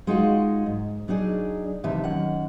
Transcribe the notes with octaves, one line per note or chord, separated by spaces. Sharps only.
G#3 D#4 F4 F#4
G#2
F#3 D4 D#4 G#4 D5
D#2 C3 E3 D#4 E5 A5
F#2 D#3 F#5